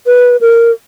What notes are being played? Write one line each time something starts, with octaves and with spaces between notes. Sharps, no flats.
B4
A#4